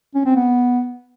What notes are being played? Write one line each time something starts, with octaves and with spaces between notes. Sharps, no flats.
C#4
C4
B3